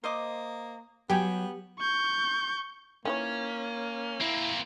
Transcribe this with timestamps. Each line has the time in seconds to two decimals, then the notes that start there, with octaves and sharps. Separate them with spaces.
0.04 A#3 C5 D#5 D6
1.10 F#3 B3 G4 G5 G#5
1.79 C#6 G6
3.05 D#3 E3 A#3 C#4 C#5
4.20 A#3 C4 E4